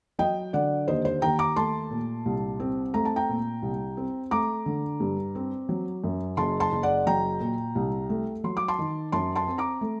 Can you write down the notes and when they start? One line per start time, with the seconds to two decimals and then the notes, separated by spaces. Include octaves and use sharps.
0.19 F#3 D#5 G5
0.53 D3 D5 F#5
0.87 D#2 C5 D#5
1.05 C5
1.22 D#2 G5 A#5
1.39 A#5 D6
1.56 A3 A5 C6
1.91 A#2
2.26 C2
2.60 C4
2.94 A3 A#5
3.05 A5
3.16 G5 A#5
3.29 A#2
3.62 C2
3.97 C4
4.31 A3 A#5 D6
4.66 D3
5.00 G2
5.35 C4
5.69 F#3
6.04 F#2
6.37 F#1 A5 C6
6.60 A5 C6
6.72 F#1
6.83 D5 F#5
7.06 F#3 G5 A#5
7.40 A#2
7.75 C2
8.10 A3
8.44 F#3 C6
8.57 D6
8.68 A5 C6
8.79 D#3
9.12 F#2 A5 C6
9.35 A5 C6
9.47 C4
9.58 A#5 D6
9.81 A3